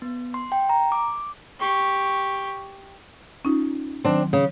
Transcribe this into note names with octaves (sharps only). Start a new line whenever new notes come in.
B3
C6
G5
A#5
D6
G4 C#6
C#4 D#4 F4
D#3 F#3 C4 D4 C6
C#3